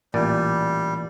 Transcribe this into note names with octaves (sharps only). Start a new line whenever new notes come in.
A1 A#2 G3 D5